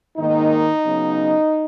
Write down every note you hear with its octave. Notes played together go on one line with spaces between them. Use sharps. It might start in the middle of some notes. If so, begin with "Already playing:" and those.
G#2 D#3 A#3 D#4
C#3 F#3 B3